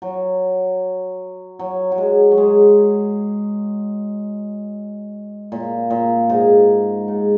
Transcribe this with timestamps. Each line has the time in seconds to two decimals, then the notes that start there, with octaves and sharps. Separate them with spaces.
0.02 F#3
1.59 F#3
1.92 F#3
1.98 G#3
2.31 F#3
2.37 G#3
5.52 A#2
5.90 A#2
6.30 G#2
7.08 G#2